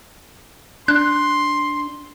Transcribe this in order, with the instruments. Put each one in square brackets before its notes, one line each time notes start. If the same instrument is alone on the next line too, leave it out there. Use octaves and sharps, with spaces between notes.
[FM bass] D4 [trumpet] C6 [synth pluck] F#6